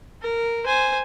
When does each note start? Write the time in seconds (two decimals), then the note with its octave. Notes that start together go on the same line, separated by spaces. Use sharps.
0.22 A#4
0.66 C5 G#5